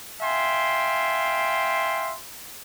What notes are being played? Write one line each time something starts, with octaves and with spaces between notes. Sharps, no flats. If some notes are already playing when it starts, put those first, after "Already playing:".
E5 F5 G5 G#5 C6